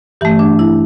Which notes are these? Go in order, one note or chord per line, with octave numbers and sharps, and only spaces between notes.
G2 E3 A3 G4
D4
E4